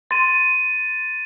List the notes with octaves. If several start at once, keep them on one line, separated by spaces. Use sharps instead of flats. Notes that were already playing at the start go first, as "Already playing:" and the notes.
C6 A6 D#7